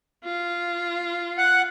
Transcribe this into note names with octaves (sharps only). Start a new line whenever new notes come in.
F4
F#5